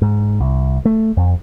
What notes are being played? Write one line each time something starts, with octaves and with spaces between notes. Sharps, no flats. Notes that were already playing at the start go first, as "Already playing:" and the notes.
G#2
C2
A3
F2